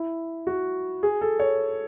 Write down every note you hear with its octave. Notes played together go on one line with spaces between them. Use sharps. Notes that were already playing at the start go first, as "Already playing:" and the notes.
Already playing: E4
F#4
G#4
A4
C#5